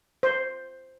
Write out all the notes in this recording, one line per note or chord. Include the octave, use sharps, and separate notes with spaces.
C5